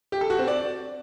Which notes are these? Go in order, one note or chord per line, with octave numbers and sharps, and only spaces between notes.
G4
A4
F#4
C4
D5